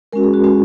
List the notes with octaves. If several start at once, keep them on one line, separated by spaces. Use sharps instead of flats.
G#3 C#4 F#4 A#4
G#4
F#4
G#3 C#4 F#4